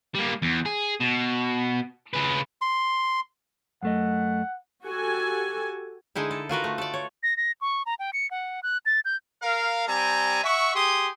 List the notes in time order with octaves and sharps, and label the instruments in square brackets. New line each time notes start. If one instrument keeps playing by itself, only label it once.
[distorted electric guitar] G3 A#3
E2
G#4
B2
C#3 B4
[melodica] C6
[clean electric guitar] F#2 A3 D#5 [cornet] F#5
[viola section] F#4 G4 A4 G#5
[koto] D3 G#3 D#4 E4
A4
F4 F#4 A#4 B4
A3
A4 D5
C#5
[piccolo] A#6
A#6
C#6
A#5
G5
C#7
F#5
F#6
A6
G6
[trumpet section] A#4 F5
G3 C4 G#5 A#5
E5 F#5 C#6
G4 G#4 C6 D#6